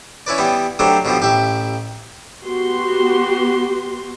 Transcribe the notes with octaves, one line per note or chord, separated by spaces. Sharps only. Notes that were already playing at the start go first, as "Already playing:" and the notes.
C#4 E4 B4 D5
E3 G3 B3
D3 F#3 G3 A3 C4 D4
B2 D3 F3 G3
A1 G4 E5
B3 F#4 G4 C6